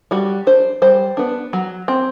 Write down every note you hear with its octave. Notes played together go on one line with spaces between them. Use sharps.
G3 F#4
D4 C5
G3 C5
B3 D4
F#3
C4